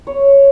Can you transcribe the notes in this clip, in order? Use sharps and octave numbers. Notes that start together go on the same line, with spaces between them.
C#5